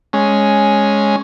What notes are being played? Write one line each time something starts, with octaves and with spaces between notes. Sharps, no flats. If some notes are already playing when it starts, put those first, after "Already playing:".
G#3 C#4